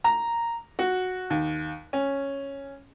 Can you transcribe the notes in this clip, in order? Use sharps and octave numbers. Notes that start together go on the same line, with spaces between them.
A#5
F#4
D#2
C#4